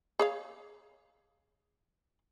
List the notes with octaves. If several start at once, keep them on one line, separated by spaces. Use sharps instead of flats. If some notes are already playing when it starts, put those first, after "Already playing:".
G#4 C#5 F5